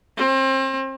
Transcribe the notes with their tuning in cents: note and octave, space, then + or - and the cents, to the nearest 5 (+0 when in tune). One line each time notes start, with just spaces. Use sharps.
C4 +35